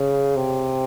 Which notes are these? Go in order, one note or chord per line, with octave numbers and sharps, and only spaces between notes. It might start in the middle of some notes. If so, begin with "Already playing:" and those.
Already playing: C#3
C3